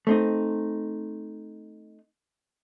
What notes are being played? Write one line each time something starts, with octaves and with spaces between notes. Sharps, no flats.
A3 C4 D#4